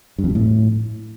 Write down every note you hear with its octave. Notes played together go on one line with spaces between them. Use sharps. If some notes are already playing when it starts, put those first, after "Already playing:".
G2
F2
B2
A2